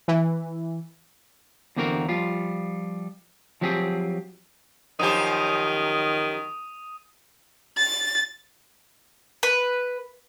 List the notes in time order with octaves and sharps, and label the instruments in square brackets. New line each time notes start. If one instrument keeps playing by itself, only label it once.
[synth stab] E3
[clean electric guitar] E2 D3 A#3 C4 F#4 A#4
F3 G3 F4
F3 F#3 C4 G4 G#4
[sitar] F#2 F3 G4 [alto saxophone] D#3 [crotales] D#6 D#7
[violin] A6
[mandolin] B4